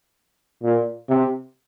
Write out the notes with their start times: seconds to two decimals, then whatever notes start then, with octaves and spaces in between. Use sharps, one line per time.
0.63 A#2
1.09 C3